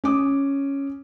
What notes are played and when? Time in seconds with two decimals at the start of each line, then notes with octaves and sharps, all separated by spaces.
0.04 C#4 D6 D#6